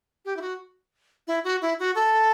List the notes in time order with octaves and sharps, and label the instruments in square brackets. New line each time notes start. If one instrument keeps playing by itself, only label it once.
[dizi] G4
E4
F#4
E4
F#4
E4
F#4
A4